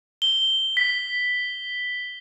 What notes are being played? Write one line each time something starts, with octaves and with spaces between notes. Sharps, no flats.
G7
B6